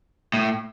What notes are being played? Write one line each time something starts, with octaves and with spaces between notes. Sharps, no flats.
A2